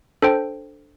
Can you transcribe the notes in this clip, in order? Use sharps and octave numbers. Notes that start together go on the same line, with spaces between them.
D4 A4 C5 G5